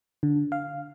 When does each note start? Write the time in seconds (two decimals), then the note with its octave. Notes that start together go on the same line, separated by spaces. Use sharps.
0.23 D3
0.52 F5